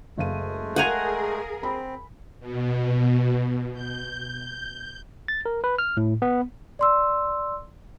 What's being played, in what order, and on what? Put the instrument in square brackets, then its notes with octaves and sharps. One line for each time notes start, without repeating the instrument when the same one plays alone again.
[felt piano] F#1 F5 D#7 [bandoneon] G#3 A3
[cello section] G#4 A#4 [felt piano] F5 G6 G#6 [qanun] F#5 G#5 A#5
[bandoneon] C4 [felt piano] B5
[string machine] B2
G6
[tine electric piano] A6
A#4
B4
F6
A2
B3
[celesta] D5 C6 E6